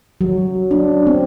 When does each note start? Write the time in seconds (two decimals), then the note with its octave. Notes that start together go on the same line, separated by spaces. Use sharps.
0.21 F#3
0.71 D4
1.07 C4